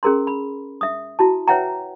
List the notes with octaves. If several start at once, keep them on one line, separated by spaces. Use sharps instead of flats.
C#4 G#4 A#4 A#5 C6
B5
E5 D#6
E4 F#4 A5
B4 C#5 E5 F#5 G5 A#5